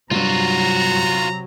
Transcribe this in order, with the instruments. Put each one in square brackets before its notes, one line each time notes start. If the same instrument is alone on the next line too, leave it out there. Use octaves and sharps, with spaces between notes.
[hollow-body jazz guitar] C2 G2 [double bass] C3 F#3 [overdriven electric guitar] F4 F#4 [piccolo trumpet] A#5